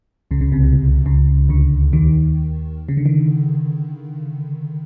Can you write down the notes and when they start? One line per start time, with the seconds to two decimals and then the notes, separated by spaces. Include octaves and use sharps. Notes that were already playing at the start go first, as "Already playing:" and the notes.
0.31 C#2 C#3
0.41 C#2 C#3
0.52 C2 C3
0.63 B2
1.06 C#2 C#3
1.49 D2 D3
1.93 D#2 D#3
2.89 C#3
2.97 D3
3.06 D#3